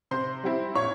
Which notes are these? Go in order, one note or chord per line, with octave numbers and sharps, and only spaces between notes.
C3 C5 C6
G3 C4 E4
A#2 C#5 C#6